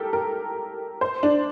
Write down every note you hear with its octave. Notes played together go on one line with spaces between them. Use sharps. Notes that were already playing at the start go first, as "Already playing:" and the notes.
Already playing: G4 A4 A#4
A#4
C5
D4